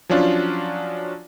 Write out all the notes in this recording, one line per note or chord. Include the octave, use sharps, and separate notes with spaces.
F3 F#3 C#4 D4 F4